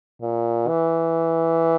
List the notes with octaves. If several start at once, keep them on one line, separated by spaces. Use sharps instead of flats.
A#2
E3